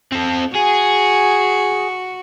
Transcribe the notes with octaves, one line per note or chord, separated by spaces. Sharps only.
C4 A4
F#4 G#4